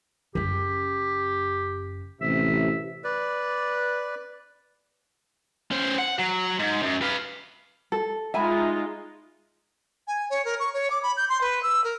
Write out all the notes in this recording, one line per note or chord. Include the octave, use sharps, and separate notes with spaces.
F#1 C#4 G4
A1 C3 E5
B4 D5
C#4 C5
F#5
F#3
G#2
F#2
B4 F5
A4
G#3 D#4 F4 E5 G#5 B5
G#5
C#5
A#4
C#6
C#5
D6
B5
G6
C6
B4
E6
A#4